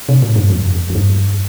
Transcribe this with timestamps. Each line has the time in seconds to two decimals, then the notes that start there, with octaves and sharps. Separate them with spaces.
0.09 C3
0.22 A2
0.36 G2
0.50 F2
0.90 F2
0.95 G2